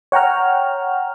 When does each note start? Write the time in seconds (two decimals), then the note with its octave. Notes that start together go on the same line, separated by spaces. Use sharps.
0.12 C#5 F#5 G5 A#5 F6